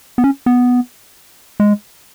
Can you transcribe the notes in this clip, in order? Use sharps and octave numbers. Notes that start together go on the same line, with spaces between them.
B3
C#4
B3
G#3